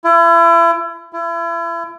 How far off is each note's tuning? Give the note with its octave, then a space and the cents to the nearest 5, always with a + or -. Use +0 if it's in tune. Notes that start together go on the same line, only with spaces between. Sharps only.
E4 +35
E4 +35